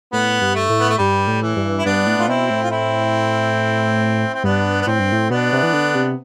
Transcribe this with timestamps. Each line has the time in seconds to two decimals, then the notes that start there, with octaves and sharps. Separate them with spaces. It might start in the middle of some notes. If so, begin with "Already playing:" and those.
0.13 A2 B3
0.41 G2
0.55 A3
0.69 A2
0.80 B3
0.89 A3
0.98 G2 G3
1.27 A2
1.42 E3
1.56 G2
1.78 E4
1.85 G2 B3 D4
2.06 A2
2.19 A2 F4
2.28 B2 C4 E4
2.50 A2
2.63 F4
2.71 C4 E4
4.34 C4
4.44 G2 B3 D4
4.81 B3
4.87 A2 C4
4.99 G2
5.12 A2
5.30 B2 B3 D4
5.53 C3
5.63 E3
5.73 D3
5.95 C3